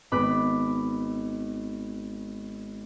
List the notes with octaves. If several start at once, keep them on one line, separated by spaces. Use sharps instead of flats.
G#1 B3 B5 D6 F#6